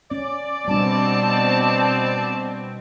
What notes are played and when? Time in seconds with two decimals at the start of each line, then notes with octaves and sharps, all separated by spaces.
0.11 C#4 D5
0.68 B2 G3 C4 D4 A5